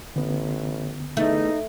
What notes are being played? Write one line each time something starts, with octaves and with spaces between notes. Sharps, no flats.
A1 D3 B3
E2 A3 D#4